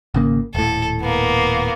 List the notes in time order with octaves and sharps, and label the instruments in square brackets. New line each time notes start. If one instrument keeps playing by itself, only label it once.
[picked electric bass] G#1 C#3 A#3
[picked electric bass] D#1 A2 [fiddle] A4
[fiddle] A#3 B3